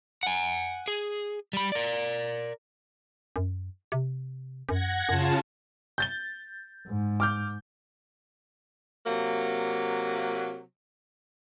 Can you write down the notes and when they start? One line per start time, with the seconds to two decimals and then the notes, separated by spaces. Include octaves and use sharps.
0.23 F#5 G#5
0.88 G#4
1.53 G3 B5
1.72 A#4 D5
3.36 F#2
3.92 C3
4.69 F#2 F#5 G#6 A#6
5.09 F#2 C#3 F4 A5
5.98 G6 A6 G7
6.87 G#2
7.20 D6 F6 G6
9.06 C3 F#3 A#3